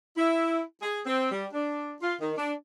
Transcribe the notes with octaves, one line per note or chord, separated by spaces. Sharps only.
E4
G#4
C4
G3
D4
F4
D#3
D4